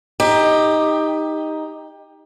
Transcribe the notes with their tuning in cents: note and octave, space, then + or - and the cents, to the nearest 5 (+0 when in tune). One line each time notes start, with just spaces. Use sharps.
D#4 +5 G4 +20